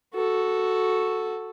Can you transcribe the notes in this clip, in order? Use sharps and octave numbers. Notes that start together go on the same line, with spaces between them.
F#4 A4